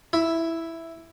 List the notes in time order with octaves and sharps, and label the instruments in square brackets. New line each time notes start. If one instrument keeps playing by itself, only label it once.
[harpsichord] E4